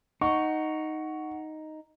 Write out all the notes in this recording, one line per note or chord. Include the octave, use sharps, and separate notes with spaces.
D#4 F#5 C#6